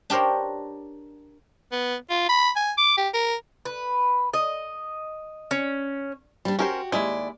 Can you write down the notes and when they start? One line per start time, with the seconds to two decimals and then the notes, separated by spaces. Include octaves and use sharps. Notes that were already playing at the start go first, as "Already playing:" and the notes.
0.10 D4 G4 A#4 C5 C#5
1.72 B3
2.10 F4
2.29 B5
2.56 G#5
2.78 D6
2.97 G4
3.14 A#4
3.65 B4
4.34 D#5
5.51 C#4
6.45 G3 D4
6.59 C#4 F#4 G4 A#4 C5
6.92 D#2 G#3 E4 D5